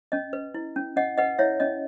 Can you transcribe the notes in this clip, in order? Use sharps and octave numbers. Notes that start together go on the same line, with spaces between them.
C#4 D#5
B4
E4
C#4
C#4 D#5 F#5
B4 D#5 F#5
E4 C#5 E5
C#4 D#5